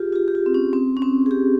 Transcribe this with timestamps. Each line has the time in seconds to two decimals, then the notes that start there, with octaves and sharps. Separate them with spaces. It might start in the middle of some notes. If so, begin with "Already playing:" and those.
Already playing: F4 G4 G#4
0.12 F4
0.16 G4
0.28 G4
0.35 F4
0.46 C4
0.54 C#4
0.73 C4
0.97 C#4
1.02 C4
1.26 G#4
1.31 G4